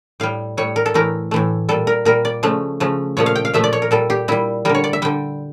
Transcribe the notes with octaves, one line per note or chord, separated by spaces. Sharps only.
A2 G3 F5
A2 G3 C#5
A#4
A4
A2 E3 A3 A#4
A2 E3 A3
A#2 G3 A4
A#4
A#2 G3 A#4
D5
C#3 F3 A3
C#3 F3 A3
A#2 F3 A3 C#5
F5
G5
F5
A#2 F3 A3 E5
D5
C#5
A#4
A#2 G3 A4
G4
A#2 G3 E4
D3 G3 A#4
C#5
D5
E5
D3 G3 G5